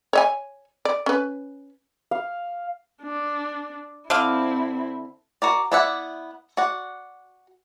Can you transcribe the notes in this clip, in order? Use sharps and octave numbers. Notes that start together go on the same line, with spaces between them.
C#5 D#5 G#5
D5
C#4 B4
F5
D4
D3 C4 E4 F5
F#4 A#4 D5
B3 E4 D5 E5 F#5
F#4 D5 F#5